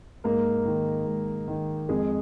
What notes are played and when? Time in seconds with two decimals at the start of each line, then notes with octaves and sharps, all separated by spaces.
0.24 G#2 A#3 A#4
0.65 D#3
1.06 G#2
1.48 D#3
1.89 F2 G#3 G#4